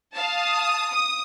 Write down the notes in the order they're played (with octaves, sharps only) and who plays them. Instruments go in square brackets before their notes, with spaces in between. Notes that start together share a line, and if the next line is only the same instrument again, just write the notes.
[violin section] F5 A5 [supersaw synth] D#6
[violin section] D#6